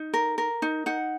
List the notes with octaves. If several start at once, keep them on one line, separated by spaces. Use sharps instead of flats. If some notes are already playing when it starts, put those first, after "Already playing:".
Already playing: D#4
A#4
A#4
D#4
D#4 F#5